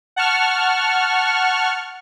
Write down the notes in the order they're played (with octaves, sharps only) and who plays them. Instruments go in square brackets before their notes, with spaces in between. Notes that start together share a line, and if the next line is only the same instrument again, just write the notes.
[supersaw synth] F#5 A5 C#6 F6